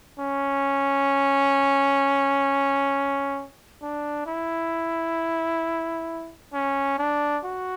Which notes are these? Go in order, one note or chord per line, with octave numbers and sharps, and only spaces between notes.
C#4
D4
E4
C#4
D4
F#4